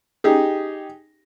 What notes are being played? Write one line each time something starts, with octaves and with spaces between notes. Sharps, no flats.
D#4 G4 G#4